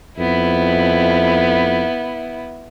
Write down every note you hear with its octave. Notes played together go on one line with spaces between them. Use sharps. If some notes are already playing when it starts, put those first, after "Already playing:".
F2 B3 E4